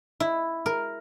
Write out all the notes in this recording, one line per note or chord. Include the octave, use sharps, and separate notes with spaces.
E4
A#4